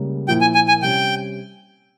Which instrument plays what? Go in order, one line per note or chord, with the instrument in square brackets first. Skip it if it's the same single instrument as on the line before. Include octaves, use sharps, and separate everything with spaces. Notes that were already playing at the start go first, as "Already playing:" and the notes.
Already playing: [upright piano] C#2 C#3 G3 A#3
[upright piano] A#2 F3 A#3 E4 [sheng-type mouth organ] G5
[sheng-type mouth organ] G#5
G#5
G#5
[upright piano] C3 G3 C#4 [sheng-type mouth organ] G5